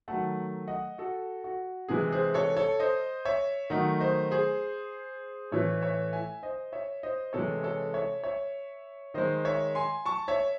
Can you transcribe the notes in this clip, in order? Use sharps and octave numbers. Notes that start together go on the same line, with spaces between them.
D#3 F#3 A3 F#5 A5
D#5 F#5
F#4 A4
F#4
C3 E3 G#3 G#4
G#4 C5
A4 C#5
A4 C#5
C5 D#5
C#5 E5
D#3 F#3 A3 D#5 F#5
C5 D#5
G#4 C5
A2 E3 A3 A4 C#5
C#5 E5
E5 G#5
C5 D#5
C#5 E5
C5 D#5
C3 E3 G#3 A4 C#5
A4 C#5
C#5 E5
C#5 E5
D#3 G#3 C5 D#5
C#5 E5
G#5 C6
A5 C#6
C#5 E5